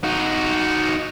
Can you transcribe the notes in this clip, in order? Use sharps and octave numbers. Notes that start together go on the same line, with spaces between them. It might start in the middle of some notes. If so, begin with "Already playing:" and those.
D#4 F#4